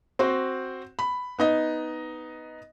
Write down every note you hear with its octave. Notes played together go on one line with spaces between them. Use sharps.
C4 F#4 C5
B5
B3 D#4 D#5